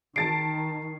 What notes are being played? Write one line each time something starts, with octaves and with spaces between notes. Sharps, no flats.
D#3 A5 A6 C7 D7